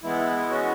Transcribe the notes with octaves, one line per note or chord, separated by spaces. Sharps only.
E3 G#3 B3 E4
C#4 F#4